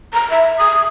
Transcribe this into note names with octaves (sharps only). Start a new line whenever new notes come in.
A#5
E5
D#6